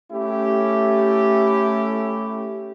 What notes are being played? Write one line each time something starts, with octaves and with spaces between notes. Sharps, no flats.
A3 C#4 E4 G4